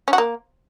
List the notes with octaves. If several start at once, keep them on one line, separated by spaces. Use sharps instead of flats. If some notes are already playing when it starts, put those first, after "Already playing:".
C#4
F#4
A#3